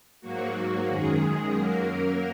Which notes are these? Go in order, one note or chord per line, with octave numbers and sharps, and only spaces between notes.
G#2 F#3 A#3 F#4
F#2 D#3 G#3 G#4
F#2 F#3 A#3 A#4